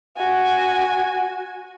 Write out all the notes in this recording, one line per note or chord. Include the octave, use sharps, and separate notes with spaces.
F#4 G#5